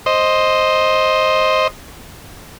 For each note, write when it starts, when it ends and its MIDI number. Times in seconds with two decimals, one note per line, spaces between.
0.06 1.67 72
0.06 1.67 75